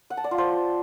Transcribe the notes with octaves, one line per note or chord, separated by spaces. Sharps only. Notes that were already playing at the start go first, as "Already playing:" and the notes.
F#5
A5
D5
F4
C5